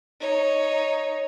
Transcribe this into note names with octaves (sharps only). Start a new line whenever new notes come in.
D#4 C#5